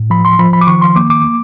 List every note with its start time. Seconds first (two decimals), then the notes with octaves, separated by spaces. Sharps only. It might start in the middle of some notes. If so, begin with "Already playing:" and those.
Already playing: A2
0.10 F3 B5
0.25 C6
0.39 F3 B5
0.53 B5
0.61 D6
0.67 D#3 C#6
0.82 C6
0.96 A#3 D6
1.10 D6
1.24 A#3